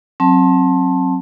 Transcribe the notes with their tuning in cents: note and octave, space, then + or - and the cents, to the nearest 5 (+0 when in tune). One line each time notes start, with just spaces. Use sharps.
F#3 +0 C4 +25 A5 +0